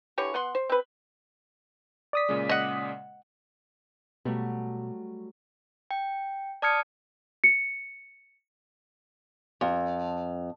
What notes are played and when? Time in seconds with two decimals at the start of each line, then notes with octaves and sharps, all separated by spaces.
0.18 D3 E3 G4 C#5
0.34 B3 F#5 C6
0.55 C5
0.69 C4 B4
2.13 D5 D#6 B6
2.29 A#2 C#3 G#3
2.49 D#5 F#5
4.25 B2 F#3 G3 A3
5.91 G5
6.62 D5 A5 D#6 F6 G#6 C#7
7.44 C#7
9.61 F2